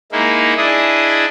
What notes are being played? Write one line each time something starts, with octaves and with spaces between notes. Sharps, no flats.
G#3 A#3 D#4 E4
D4 E4 G#4 D#5